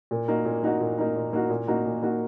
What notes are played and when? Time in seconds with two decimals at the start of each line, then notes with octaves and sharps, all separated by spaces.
0.11 A#2
0.28 A#3 D#4 F#4
0.45 A#2
0.62 A#3 D#4 F#4
0.80 A#2
0.98 A#3 D#4 F#4
1.16 A#2
1.33 A#3 D#4 F#4
1.50 A#2
1.67 A#3 D#4 F#4
1.85 A#2
2.03 A#3 D#4 F#4